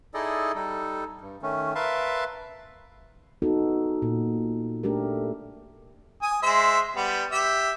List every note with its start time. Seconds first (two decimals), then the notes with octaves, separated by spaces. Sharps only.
0.14 D#4 E4 G#4 A4 D5 D#5
0.55 G3 D#4 A4
1.21 G2
1.42 D#3 A3 C#4
1.75 A#4 B4 E5 F5 A5 C6
3.42 B3 D#4 F#4 A4
4.02 A#2
4.83 A3 D4 G4 A4 A#4
6.22 G#5 D#6
6.42 G#3 C5 E5
6.96 G3 B3
7.32 G4 E5